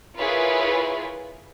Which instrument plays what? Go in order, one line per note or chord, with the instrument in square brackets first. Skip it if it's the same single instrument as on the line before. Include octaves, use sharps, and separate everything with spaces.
[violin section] E4 F4 G#4 A#4 B4 C#5